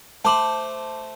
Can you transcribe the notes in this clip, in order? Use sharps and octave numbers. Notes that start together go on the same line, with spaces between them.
A3 C5 A5 D6 F#7